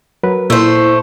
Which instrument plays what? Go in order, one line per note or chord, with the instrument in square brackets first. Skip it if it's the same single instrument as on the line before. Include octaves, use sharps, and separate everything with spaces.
[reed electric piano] F#3 A#4 B4
[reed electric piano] A#2 [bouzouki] A3 C5 [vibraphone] E4